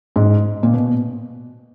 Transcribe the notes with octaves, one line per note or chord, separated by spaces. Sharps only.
G#2
A#2
B2